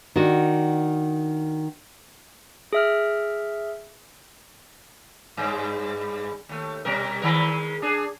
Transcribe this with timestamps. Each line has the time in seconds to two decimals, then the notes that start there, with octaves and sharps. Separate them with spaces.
0.16 D#3 D4 F#4
2.73 G#4 E5 F6
5.37 G2 G#3
6.49 D#2 A3
6.85 B2 G3 A#4
7.22 D#3 G#3 A#4
7.82 D4 G#4